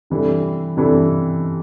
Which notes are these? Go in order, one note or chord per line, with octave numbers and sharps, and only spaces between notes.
C3 E3 G3 D4 A4
C3 E3 G3 D4 A4